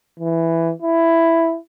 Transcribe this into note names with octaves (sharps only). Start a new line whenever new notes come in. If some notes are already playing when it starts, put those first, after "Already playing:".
E3
E4